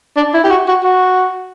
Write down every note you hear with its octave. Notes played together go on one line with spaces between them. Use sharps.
D4
E4
G4
F#4
F#4
F#4